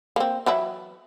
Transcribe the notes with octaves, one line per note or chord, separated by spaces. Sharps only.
A#3 C4
E3 F#3 E4